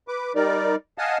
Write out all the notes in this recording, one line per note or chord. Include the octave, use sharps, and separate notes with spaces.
B4 D6
G3 D#4 A#4 D5
D#5 F5 F#5 G#5 A5 D#6